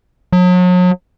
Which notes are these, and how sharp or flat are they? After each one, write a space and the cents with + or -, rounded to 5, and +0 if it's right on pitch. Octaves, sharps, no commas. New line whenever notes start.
F#3 -40